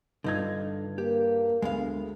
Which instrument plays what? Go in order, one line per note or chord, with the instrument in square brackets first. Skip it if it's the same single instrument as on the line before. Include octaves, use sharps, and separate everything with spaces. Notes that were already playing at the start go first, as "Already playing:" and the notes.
[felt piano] G2 G#6 [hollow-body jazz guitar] D3 D#4 F4
[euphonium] A#3 [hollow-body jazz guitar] G4
[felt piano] D2 [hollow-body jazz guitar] G#3 B3 F5